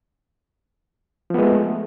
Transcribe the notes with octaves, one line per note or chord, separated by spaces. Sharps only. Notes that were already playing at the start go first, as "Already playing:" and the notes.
F3 G#3 A3 B3